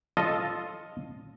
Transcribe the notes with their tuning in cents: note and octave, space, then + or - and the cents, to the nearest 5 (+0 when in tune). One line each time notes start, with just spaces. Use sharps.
F4 +0 A4 +0 D#5 +0